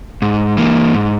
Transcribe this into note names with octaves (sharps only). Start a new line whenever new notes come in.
G#2
E3 A#3
G#2